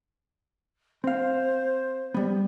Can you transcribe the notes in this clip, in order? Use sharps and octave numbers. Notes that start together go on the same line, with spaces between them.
C4 C5 F5
G3 B3